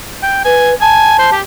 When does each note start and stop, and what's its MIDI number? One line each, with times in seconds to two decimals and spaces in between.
0.23 0.43 79
0.45 0.74 71
0.45 0.71 80
0.81 1.17 80
0.81 1.33 81
1.19 1.30 72
1.32 1.41 67